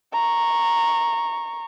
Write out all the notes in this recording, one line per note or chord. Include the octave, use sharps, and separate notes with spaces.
A#5 C#6